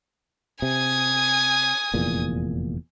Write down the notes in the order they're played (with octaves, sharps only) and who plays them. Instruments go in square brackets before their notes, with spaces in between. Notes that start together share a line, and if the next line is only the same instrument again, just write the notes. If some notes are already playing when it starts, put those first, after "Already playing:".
[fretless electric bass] C3 [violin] G#5 D#6
[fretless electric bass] F1 E2 A#2